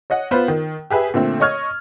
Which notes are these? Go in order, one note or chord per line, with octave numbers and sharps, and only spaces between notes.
C#5 D#5 F#5
B3 F4 B4 C5
D#3
G4 G#4 B4 E5
A#2 D3 A3 C4
C#5 D#5 C#6 F6 G#6